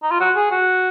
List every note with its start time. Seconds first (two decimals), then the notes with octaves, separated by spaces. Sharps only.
0.03 D#4
0.11 F4
0.20 F#4
0.36 G#4
0.51 F#4